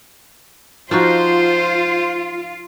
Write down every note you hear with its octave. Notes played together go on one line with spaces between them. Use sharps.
F3 D#4 F4 F#4 C5